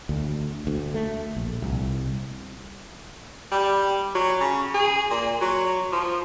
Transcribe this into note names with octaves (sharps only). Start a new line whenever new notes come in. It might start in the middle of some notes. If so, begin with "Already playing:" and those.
D2
D2
A3
A#1
C2
G3
F#3
C#3
G#4
A#2
F#3
F3